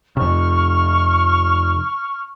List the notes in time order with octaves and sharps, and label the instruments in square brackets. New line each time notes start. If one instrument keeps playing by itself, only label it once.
[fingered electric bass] F2 C3 [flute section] C#6 F6